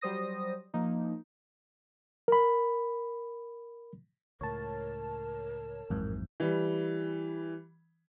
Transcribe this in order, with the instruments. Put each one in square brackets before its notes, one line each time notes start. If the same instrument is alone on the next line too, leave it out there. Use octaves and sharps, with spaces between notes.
[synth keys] F#3 G3 C5 D#6 A#6
F3 A#3 D#4
[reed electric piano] A#4 B5
[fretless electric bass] C#2 A2 [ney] A#4 [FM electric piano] C#5 A5
[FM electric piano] A1 F2 G#2 [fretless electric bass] E3 F#3 C4
[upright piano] E3 G3